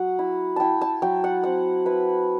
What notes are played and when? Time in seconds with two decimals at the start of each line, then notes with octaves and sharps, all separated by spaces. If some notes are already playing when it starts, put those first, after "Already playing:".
Already playing: F#3 F#5
0.19 E4
0.56 E4 G5 A5
0.81 A5
1.02 F#3 G5
1.24 F#5
1.44 C4 F#5
1.86 E4 B4